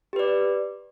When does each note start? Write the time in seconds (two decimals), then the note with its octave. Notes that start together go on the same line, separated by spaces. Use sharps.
0.13 G4
0.16 B4
0.19 D5